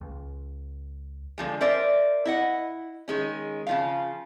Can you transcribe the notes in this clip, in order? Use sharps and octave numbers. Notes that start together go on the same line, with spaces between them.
C#2
D3 F3 G#3
A#4 C5 D5 E5
E4 D#5 F#5
D#3 G#3 C#4
C#3 F3 F5